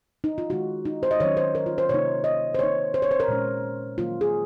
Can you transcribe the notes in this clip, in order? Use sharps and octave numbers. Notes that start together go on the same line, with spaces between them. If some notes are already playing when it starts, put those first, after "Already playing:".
D#4
F4
D#3 G#3 D#4 F#4
D#4
C5
D#5
D#3 F#3 C#4 C#5
C5
A#4
F4
C5
C3 D#3 A#3 D#4 C#5
D#5
C5
D#3 A#3 D#4 C#5
C5
C#5
C5
A#4
A#2 G#3 C#4
D#3 F#3 A#3 F4
G#4